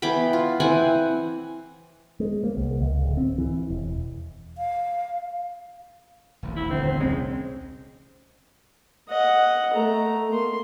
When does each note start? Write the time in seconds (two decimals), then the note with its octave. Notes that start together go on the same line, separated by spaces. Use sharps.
0.02 E3 B3 G5 B5
0.33 F4
0.60 E3 C4 F#5 G#5
2.20 G#3
2.44 A#3
2.57 C2
2.81 C#2
3.06 D1
3.17 C4
3.38 E3
3.70 E1
4.58 F5
6.43 D#1 A1 D#2
6.56 E4
6.70 E2 D3 C4
6.83 C5
7.00 C2 G#3 C4 C#4
9.09 D#5 F#5
9.74 A3 A#5
10.30 A#3 C6